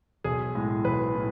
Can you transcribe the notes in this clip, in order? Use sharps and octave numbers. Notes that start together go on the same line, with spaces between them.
B1 G#4
A2 G#3
B1 B4
A2